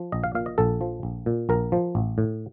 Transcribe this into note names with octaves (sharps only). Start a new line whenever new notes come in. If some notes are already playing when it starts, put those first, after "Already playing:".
Already playing: F3
A#1 D#5
F5
A#2 F5
D#5
A#1 A4
F3
A#1
A#2
A#1 A#4
F3
A1
A2